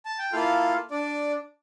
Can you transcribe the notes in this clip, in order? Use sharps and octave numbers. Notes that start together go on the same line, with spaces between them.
A5
G5
A#3 E4 F4 A4 F5
D4 D5